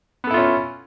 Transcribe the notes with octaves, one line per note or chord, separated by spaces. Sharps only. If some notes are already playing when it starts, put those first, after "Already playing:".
B3 C#4 E4 F4 A4